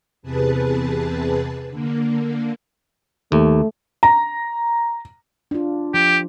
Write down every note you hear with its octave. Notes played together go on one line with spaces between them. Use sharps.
E2 C3 G#4 B4 A5
D3 A#3
D#2 A3
A#5
D4 F4
F3 G4